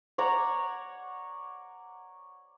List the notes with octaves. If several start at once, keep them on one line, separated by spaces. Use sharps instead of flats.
C#5 D5 F#5 A#5